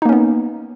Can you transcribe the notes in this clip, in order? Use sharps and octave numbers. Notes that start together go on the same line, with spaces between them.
A#3 B3 C#4 D#4